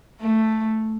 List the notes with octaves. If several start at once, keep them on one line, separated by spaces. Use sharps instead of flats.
A3